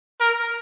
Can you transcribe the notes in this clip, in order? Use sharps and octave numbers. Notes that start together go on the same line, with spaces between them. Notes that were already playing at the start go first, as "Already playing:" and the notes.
A#4